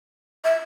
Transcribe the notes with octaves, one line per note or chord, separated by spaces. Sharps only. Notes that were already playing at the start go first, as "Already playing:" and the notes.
E5